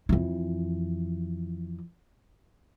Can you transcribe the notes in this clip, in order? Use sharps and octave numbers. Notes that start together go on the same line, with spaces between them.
F2 E3